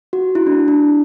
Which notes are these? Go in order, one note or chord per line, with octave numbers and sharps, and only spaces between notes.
F#4
E4
D4
D4